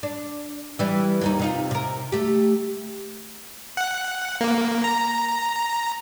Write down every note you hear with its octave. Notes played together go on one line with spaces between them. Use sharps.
D4
E3 G3
D#2 D#3 D#4
C3 D#4 F4
C3 A#4
A3 G4
F#5
A#3
A#5